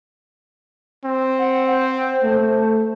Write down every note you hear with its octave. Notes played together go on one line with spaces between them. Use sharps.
C4
F#5
C5
A3